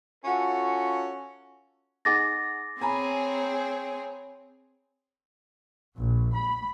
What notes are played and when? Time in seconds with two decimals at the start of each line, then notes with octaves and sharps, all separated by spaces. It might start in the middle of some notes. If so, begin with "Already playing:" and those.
0.24 C#4 F4 F#4 A4
2.05 D#4 G#4 F#5 D6 A6 A#6
2.81 C4 G#4 C#5 G#5 A#5 B5
5.97 A#1
6.35 B5